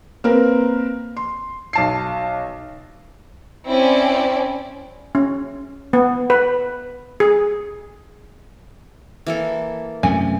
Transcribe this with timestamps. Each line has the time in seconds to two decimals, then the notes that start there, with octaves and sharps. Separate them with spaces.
0.24 A#3 C4 A#4 B4
1.17 C6
1.73 B1 A5 C7
3.67 C4 C#4 E4 D5
5.15 C#4
5.93 B3
6.30 B4
7.20 G#4
9.26 E3 A#3 A4
10.03 F#2 C3 A3 G#5